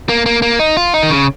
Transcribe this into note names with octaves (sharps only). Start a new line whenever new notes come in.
A#3
A#3
A#3
D#4
F4
D#4
D#3
C#3